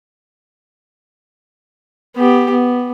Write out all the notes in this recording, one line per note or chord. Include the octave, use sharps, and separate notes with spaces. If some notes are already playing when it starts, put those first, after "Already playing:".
B3 G4
B3